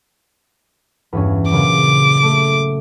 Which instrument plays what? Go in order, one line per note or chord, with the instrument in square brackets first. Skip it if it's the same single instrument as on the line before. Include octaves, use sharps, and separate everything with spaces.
[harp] E2 G2 C#4
[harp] A#2 C#3 F#3 [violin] D6
[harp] A3